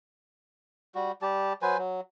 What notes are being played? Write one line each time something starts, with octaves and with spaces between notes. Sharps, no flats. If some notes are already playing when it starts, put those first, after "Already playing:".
G3 F#4
G3 G4 A5
F#3 B4 C5 G#5
F#3